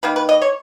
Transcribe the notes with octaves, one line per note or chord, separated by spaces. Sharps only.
D#3 A#3 B4
B4
D#5
C#5